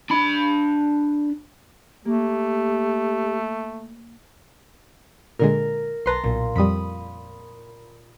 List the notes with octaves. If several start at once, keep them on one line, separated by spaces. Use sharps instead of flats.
D4 B5
A3 A#3 G4
A#2 D3 G#3 A#4
B1 B4 A5 A#5 C6
B1 A#2
F2 G3 B5 D#6